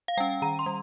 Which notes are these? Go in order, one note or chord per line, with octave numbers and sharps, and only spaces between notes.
F5
G3 C#4 G5
D#3 A#5
C6
G3